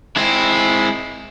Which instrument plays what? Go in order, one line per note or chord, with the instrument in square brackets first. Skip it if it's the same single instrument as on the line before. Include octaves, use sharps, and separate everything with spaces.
[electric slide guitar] G#3 C4 [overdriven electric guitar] E4 E5